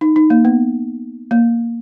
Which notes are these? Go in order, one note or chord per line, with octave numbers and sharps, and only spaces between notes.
D#4
D#4
A#3
B3
A#3